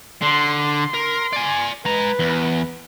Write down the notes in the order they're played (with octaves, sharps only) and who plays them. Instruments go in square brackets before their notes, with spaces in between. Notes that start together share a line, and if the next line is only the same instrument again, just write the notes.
[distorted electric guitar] D3 [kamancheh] C6
[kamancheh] C6
[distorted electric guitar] A#4
D5 G#5
[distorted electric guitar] G#3 A#5 [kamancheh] B4
[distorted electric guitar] E2